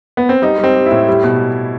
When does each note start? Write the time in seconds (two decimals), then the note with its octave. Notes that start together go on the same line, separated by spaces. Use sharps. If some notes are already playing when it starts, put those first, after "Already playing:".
0.17 B3
0.29 C4
0.42 G3 D#4
0.58 G3
0.64 C4
0.76 G3
0.86 E4
0.92 A2
1.08 G3
1.24 B2